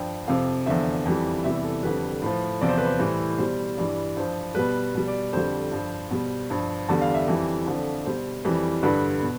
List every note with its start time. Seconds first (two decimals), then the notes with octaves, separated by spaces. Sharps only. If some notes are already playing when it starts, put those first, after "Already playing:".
Already playing: G2 F3 G5
0.27 F2 C3 F3 F5
0.66 E2 D3 F3 E5
1.05 F2 E3 G3
1.44 E2 C3 E3 G3 E5
1.64 A4
1.82 F2 D3 G3 B4
2.22 A2 F3
2.61 E2 C3 F3 D5
2.69 C5
2.78 B4
2.86 C5
2.99 A2 E3 G3
3.38 B2 G3 C5
3.77 G2 E3 G3 D5
4.17 G2 F3 C5
4.55 B2 G3 B4
4.95 B2 G3
5.07 D5
5.33 F2 D3 G3 C5
5.71 G2 F3
6.11 B2 G3
6.50 G2 F3
6.89 E2 D3 G3 A5
7.01 F5
7.14 E5
7.28 F2 E3 G3
7.66 F2 D3 F3
8.06 B2 G3 C5
8.44 F2 E3 G3
8.83 G2 D3 G3 B4
9.22 B2